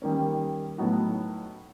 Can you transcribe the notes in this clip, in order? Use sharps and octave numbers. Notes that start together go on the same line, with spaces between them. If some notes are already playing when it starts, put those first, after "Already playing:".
D#3 G3 A#3 C#4
A2 F#3 B3 D#4 F#4